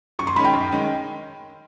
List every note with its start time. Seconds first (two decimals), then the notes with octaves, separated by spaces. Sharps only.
0.19 F#2 C#6
0.27 C6
0.36 D#3 G#3 C#4 B5
0.44 G5
0.53 F#2
0.71 D#3 G#3 C#4